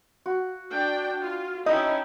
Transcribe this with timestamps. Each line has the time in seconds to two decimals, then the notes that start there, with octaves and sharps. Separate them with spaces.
0.26 F#4
0.71 D4 G5
1.23 F4
1.66 C#4 D#4 E4 D#5 G5 A5